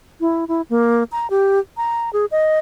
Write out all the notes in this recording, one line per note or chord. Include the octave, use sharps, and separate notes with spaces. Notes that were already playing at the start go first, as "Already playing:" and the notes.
E4
E4
A#3
A#5
G4
A#5
G#4
D#5